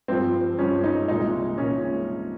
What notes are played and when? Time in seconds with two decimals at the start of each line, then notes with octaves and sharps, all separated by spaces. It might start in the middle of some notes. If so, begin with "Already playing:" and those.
0.08 G2 F3 G#3 C4
0.59 G2 F3 G#3 C#4
0.84 D#4
1.08 C2 A#2 G#3 D#4
1.58 A#2 G#3 C#4